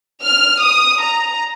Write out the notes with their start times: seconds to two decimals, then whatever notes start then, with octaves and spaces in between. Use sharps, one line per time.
0.23 F6
0.62 D#6
1.02 A#5